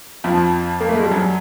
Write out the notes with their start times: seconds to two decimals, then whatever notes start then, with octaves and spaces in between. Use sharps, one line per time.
0.24 F2 F3
0.80 A#3
0.89 A3
0.96 G#3
1.03 G3
1.11 F#2 F#3